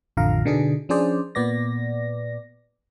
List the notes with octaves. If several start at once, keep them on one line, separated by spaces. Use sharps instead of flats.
A1 F2 D3 F4 F5 A#5
B2 D3 B3 D4 D#4 G#4
F3 C#4 D4 G#4 C5 D5
A#2 B3 D5 A#6